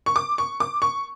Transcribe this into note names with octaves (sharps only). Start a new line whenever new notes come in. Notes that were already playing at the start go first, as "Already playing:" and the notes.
C#6
D6
C#6
D6
C#6